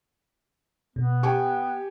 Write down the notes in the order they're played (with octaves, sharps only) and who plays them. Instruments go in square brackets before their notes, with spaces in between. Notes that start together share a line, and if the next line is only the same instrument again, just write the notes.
[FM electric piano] B2 [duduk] B3
[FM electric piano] G4 [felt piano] G5 G#5 C#6